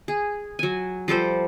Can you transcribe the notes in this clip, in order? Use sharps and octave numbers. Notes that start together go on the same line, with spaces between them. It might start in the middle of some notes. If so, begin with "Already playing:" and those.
G#4
F#3 G#5
F3 G3 A4 C5